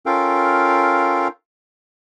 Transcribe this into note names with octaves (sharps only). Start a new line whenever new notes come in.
C#4 F4 A4 A#4 F5 G5